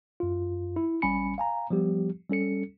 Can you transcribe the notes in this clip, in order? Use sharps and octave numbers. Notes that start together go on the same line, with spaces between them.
F#2 F4
E4
A1 G3 C#4 G#5 B5 C#7
F5 G#5 A#5
F3 G3 B3 G4
G3 C#4 A4 C#7